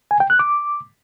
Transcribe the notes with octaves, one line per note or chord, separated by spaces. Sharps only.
G#5
G5
F#6
D6